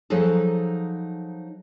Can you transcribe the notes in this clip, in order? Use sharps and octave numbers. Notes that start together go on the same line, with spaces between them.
F3 F#3 D#4 G#4 A4